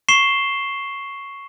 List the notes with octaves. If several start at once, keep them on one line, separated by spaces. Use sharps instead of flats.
C#6 C7 E7 G7